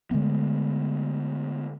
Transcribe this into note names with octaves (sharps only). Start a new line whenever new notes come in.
D3 G#3 A3 B3